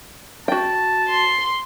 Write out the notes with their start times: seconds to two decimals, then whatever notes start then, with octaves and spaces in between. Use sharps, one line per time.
0.48 F#4 G5 A5
1.09 C6